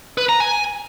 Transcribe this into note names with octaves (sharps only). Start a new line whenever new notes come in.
B4
A#5
G#5